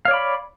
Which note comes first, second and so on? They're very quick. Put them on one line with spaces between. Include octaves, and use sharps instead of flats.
F5 C#5 D5 B5